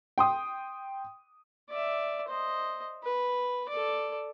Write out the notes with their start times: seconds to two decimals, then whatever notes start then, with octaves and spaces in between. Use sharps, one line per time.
0.18 G5 C6 D#6
1.69 D5 E5
2.28 C5 D#5
3.03 B4
3.69 A4 D5